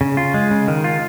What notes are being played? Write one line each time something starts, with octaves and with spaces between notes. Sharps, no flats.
C#3
F4
G#3
C#3
D#3
F4